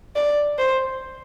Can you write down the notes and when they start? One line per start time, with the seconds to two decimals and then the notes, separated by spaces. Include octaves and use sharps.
0.16 D5
0.58 C5